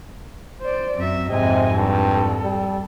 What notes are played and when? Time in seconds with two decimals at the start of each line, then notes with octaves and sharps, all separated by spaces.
0.61 C5 D5
0.97 F#2 C4 E5
1.29 F2 G#2 C3 D#5 G#5
1.76 G2 A4
2.42 G3